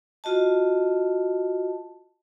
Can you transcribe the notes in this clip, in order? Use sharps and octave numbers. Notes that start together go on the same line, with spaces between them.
F4 F#4 D#5 A5